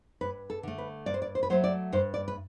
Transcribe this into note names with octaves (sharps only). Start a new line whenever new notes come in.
G2 B4
A4
D3 A3
B4
G2 D5
C5
D5
C5
B4
F#3 A3 C5
D5
G2 C5
D5
B4